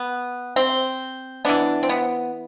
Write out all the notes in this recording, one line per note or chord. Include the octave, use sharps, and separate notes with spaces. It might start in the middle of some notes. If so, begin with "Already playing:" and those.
Already playing: B3
C4
E3 B3 D4
C4
B3